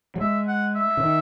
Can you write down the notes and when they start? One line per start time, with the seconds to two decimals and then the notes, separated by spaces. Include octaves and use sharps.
0.16 F#3
0.20 G#3 E5
0.48 F#5
0.75 E5
0.97 C#3
1.03 D#3